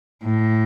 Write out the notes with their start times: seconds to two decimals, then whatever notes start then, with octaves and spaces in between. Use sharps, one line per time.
0.24 A2